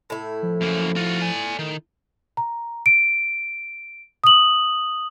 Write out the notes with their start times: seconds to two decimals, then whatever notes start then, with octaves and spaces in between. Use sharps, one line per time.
0.10 A2 E4
0.43 F3
0.61 F#2 A#3
0.96 F4 F#4
1.22 D5 G#5
1.59 D#3
2.37 A#5
2.86 D7
4.24 D#6 F#7